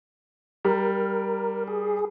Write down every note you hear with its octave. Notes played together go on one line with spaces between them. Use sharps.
G3 A#4
G#4